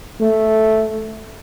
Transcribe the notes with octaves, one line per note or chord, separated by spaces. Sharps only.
A3